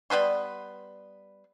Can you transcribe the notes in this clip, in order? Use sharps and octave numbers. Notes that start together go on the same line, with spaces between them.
G3 B3 B4 C6